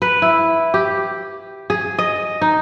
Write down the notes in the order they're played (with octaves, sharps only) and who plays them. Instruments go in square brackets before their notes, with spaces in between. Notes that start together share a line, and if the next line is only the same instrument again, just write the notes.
[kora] B4
E4
G4
G#4
D#5
D#4